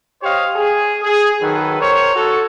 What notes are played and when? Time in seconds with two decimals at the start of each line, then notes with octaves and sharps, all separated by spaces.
0.22 G4 C5 C#5 D#5 F5
0.56 G#4
1.03 G#4
1.41 D#3 F#3 A4 B4
1.80 A#4 C5 C#5
2.14 F#4 A4